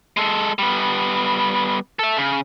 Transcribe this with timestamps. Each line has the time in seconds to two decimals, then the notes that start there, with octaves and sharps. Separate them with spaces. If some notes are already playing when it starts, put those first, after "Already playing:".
0.17 G#3 A4
0.59 G3 B3
1.99 A4 E5
2.17 C#3